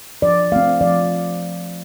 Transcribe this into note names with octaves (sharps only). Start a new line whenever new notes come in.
F3 D5
A3 C4 F5
F3 D5